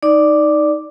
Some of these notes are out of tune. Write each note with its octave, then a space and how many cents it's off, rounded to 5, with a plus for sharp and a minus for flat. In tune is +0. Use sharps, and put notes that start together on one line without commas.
D#4 +0 D5 +0 D6 +0